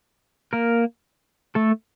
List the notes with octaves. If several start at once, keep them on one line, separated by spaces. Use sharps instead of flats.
A#3 A#4
A3 A4